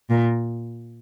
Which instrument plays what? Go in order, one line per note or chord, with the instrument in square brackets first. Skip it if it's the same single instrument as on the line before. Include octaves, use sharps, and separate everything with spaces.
[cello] A#2